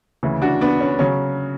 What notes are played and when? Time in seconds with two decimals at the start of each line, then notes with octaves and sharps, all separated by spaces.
0.23 D2 C#3 E3
0.42 D4 F#4
0.61 B3 D4
0.80 C#4
0.99 C#3 F#3 C#4